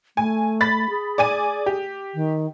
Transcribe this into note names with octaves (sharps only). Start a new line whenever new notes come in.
A3 G#5
B5 A6 B6
G#4
D5 G#5 D#7
G4
D#3